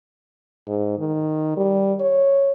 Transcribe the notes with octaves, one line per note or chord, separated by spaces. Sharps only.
G#2
D#3
G3
C#5